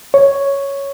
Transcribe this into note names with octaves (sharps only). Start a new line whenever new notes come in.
C#5